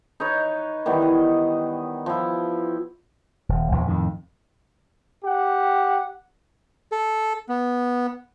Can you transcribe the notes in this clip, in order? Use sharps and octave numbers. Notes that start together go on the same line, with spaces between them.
D#4 B4 C#5
D#3 E3 G3 B3
D#5
F3 E4
D#1
A#1 E2 E3
F2 A2 D#3
G4 F#5
A4
B3